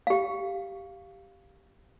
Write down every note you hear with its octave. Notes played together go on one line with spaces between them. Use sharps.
G4 F5